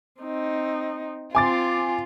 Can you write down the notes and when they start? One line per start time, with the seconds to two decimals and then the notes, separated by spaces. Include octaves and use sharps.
0.21 C4 D#4
1.35 C4 F4 G#5 C6 D6 A6